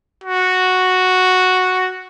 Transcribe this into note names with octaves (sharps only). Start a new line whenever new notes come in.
F#4